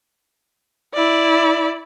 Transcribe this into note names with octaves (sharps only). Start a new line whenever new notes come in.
E4 D5